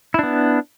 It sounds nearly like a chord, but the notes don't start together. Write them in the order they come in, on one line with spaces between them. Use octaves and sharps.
E4 D4 B3